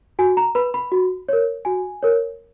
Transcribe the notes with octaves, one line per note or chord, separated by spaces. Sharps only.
F#4 G#5
A#5
B4 B5
B5
F#4
A#4 C#5
F#4 G#5
A#4 C#5